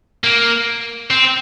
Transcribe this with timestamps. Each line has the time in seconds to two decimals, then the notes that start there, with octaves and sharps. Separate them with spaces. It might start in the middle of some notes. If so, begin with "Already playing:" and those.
0.24 A#3
1.11 C4